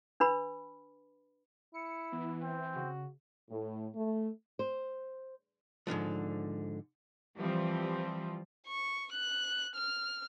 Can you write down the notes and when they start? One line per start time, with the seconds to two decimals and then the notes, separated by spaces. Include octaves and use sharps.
0.20 D4 B4 B5
1.74 E4 C#7
2.12 E3 B3
2.43 C4
2.76 C#3 F#4
3.50 A2
3.95 A3
4.59 C5
5.87 G#2 D3 E3 F3
7.37 E3 F3 G3 C4
8.68 C#6
9.13 F#6
9.75 F6